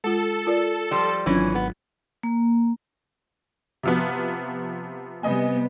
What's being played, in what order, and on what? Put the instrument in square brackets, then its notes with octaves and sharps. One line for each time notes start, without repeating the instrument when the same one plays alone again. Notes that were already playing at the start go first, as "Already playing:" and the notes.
[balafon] G#3 F4 [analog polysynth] A4
[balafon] F4 A#4 D5
[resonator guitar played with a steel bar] F3 G3
[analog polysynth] G#1 [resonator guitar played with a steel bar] E3 C#4 [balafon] F#3 D4 F4
[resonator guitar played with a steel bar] B3
[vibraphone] A#3
[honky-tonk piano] C3 F3 B3
[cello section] C3 G3 B3 [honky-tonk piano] D#5 G#5